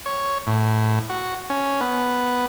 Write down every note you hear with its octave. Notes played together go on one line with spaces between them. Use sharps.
C#5
A2
F#4
C#4
B3